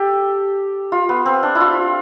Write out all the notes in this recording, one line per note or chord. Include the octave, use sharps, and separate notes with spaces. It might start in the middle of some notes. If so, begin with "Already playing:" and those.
Already playing: G4 A4
F4
B3
C4
D4
E4
F4